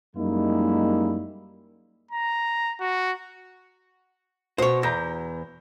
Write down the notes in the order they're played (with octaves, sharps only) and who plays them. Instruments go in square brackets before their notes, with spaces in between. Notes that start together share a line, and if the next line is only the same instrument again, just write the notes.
[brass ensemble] F#2 G3 G#3 A#3 D#4 E4
[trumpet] A#5
F#4
[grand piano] B2 [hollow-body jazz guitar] C5 C#5
[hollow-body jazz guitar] E2 [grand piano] A#5 G6 A#6